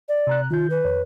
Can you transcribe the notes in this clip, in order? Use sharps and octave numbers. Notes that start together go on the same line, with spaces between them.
D5
C3 A#5 F#6
D#3 F4 G6
B4
F2 C#5